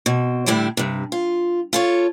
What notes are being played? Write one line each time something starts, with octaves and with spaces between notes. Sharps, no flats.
B2 C4
A2 D3 G3 E4 D5
G2 C3
F4
F4 A4 C#5